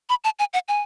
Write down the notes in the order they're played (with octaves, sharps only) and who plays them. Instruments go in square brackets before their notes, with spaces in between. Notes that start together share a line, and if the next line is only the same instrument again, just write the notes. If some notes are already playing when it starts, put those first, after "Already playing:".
[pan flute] B5
A5
G#5
F#5
G#5